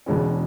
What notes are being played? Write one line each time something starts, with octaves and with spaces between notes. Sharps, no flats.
E1 E2 B2 G#3 C#4